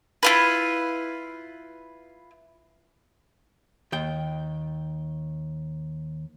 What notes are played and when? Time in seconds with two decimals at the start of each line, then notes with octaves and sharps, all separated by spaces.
0.23 E4 F4 B4
3.92 D#2 G5